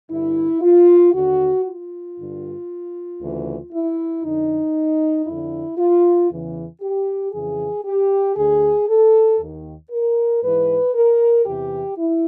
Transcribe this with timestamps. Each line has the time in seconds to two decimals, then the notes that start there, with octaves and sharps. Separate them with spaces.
0.10 G2 D3 E4
0.62 F4
1.13 D#2 D3 F#4
1.65 F4
2.17 G2 D3
3.20 D2 C#3 E3
3.72 E4
4.23 F2 D3 D#4
5.26 F2 D3 E4
5.78 F4
6.30 E2 C#3 E3
6.81 G4
7.33 F2 C#3 E3 G#4
7.85 G4
8.36 D2 D3 G#4
8.88 A4
9.39 D#2 D#3
9.91 A#4
10.42 G#2 E3 B4
10.94 A#4
11.45 E2 C3 E3 G4
11.97 E4